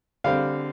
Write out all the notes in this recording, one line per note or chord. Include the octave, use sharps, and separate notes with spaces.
D3 G3 C4 F5